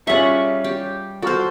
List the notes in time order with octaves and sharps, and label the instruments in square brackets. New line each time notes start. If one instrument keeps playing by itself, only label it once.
[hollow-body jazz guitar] G3 E5 [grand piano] C#4 F4 G#4 [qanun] F#5 C#6
[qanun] G4
[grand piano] F#4 C#6 F6 [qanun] A4 C5